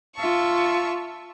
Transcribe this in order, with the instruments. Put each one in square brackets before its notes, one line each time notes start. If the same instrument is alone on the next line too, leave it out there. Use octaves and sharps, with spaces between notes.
[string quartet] F4 E5 A5 C#6